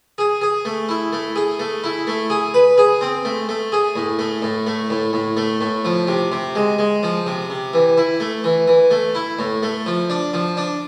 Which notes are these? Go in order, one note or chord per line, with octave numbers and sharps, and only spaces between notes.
G#4
G#4
A3
E4
A3
G#4
A3
E4
A3
G#4
B4
G#4
C4
A3
A3
G#4
A2
A3
A2
A3
A2
A2
A3
A2
F3
C3
C3
G#3
G#3
F3
C3
C3
E3
E4
A3
E3
E3
A3
E4
A2
A3
F3
D4
F3
D4